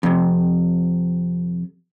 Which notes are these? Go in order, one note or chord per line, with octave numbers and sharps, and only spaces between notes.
F2 C3